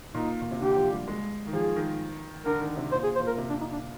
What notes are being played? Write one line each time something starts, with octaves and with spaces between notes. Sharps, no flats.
A#2 D#4
A#2
C3
D3 G4
F3
G3
G#3
D#3
F3 G#4
D#3
D3 A#4
D#3
C3
A#2 C5
G#4
C5
A#2
A#4
C3
D4
D#4
D4